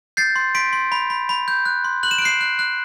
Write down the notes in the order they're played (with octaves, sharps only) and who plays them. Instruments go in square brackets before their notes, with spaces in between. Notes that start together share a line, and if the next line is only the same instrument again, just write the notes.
[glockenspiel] G6 A6 C7
C6
C6 B6 D7
C6
B5
B5
B5
G6
F#6
C6
F#6 F#7
E7
D7
F#6 C7 E7
F#6
F#6